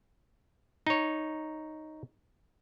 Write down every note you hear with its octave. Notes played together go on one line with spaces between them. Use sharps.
D#4 C#5